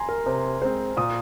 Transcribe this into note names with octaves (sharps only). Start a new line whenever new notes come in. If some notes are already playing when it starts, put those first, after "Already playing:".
Already playing: G#5 A#5 C6
A#4
C3 C5
G#3 C4 C5
A#2 D#6